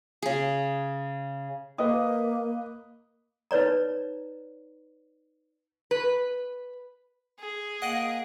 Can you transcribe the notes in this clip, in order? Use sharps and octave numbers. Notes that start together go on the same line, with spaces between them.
C#3 G#4
A#3 B4 D#5 D#6
D#4 B4 C#5 D5 A#5
B4
G#4
A#3 D#5 F#5 G5